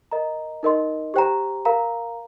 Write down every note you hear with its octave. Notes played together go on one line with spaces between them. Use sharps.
A#4 D#5 A#5
D#4 A#4 D#5 C6
G4 C5 G5 A#5
A#4 F5 A#5